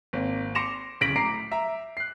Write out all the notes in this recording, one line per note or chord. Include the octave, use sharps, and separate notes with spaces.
G#1 A#3 C4
C6 D6 A#6 C#7 E7 F7
D1 C#3 A#6 B6 D7 F#7
A2 A#5 D6 C7 D7
E5 A#5
F#6 C7